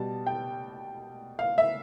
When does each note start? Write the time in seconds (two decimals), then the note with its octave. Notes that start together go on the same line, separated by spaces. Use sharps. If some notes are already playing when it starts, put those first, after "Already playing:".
Already playing: B2 G3 A5
0.27 G5
1.39 F5
1.58 E5